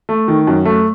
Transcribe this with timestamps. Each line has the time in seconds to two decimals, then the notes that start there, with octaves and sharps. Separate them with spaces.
0.09 A3
0.28 D#3
0.47 F#2
0.65 A3